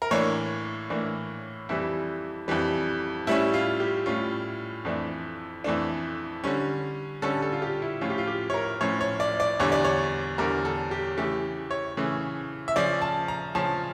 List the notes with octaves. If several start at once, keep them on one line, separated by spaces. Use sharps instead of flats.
A#4
A2 E3 A#3 D4 C#5
A2 E3 A#3 D4
F2 E3 G3 E4
F2 E3 G3
A2 G3 C#4 E4
F4
G4
A2 G3 C#4 F4
F2 E3 A3 D4
F2 E3 A3 D4
D3 G3 C#4
D3 G3 C#4 A4
A4
F4
G4
E4
A2 F3 C#4 F4
G4
F4
G4
C#5
A#4
A2 F3 C#4 C#5
C#5
D5
D5
E2 D3 G3 C#5
D5
C#5
E2 D3 G3 A#4
A4
G4
C#3 E3 A3 G4
C#5
C#3 E3 A3
E5
C#3 F3 C#4 D5
A5
A#5
C#3 F3 C#4 A5